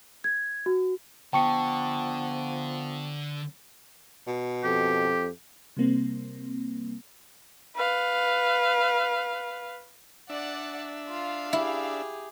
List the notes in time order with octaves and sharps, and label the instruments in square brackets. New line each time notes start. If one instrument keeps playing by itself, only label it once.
[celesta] G#6
F#4
[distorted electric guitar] D3 [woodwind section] F3 B3 [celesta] G5 [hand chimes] A5 C#6 C#7
[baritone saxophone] B2
[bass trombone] F2 [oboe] G4
[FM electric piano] C3 G3 A#3 C4
[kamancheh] B4 F5
[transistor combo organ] D4 E5 [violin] D5 F#5
[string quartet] F4 [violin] F5
[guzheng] E4 [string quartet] G4 G#4